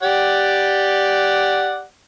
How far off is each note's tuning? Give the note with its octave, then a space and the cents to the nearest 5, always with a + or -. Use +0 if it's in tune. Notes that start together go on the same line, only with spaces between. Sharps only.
G4 +0 D5 +0 F#5 +0